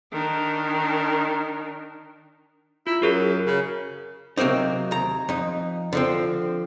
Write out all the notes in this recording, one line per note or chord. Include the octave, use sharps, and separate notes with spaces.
D#3 D4
E4 F4
F#2 F#4 G#4 A#4
C#3
C3 F#3 A#3 C4 D#4
D#2 A#5
F2 D#4
D3 F3 C4